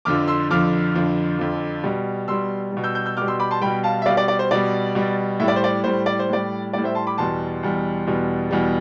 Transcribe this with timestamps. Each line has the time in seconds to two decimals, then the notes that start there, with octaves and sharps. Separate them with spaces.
0.05 F2 D3 F3 D6 F6
0.28 C6 E6
0.50 F2 D3 F3 D6 F6
0.94 F2 D3 F3
1.39 F2 D3 F3
1.84 B2 G3
2.28 B2 G3 C6 E6
2.72 B2 G3
2.84 E6 G6
2.95 E6 G6
3.06 E6 G6
3.17 B2 D6 F6
3.22 G3
3.28 C6 E6
3.39 B5 D6
3.51 A5 C6
3.61 B2 G3 G5 B5
3.84 F5 A5
4.02 E5
4.06 B2 G3 D5 F5
4.17 D5
4.28 D5
4.39 C5
4.51 B2 G3 D5
4.95 B2 G3
5.40 A2 E5
5.43 G3 D5
5.56 C5
5.64 D5
5.84 A2 G3 C5
6.06 D5
6.19 C5
6.29 A2 G3 D5
6.73 A2 G3 D5
6.84 C5 E5
6.95 A5 C6
7.07 B5 D6
7.18 E2 B2 G3 A5 C6
7.63 E2 B2 G3
8.07 E2 B2 G3
8.51 E2 B2 G3